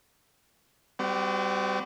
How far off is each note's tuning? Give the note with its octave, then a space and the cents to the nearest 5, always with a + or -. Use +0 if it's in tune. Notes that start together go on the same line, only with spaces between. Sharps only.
G3 +0 C4 -40 F#4 +0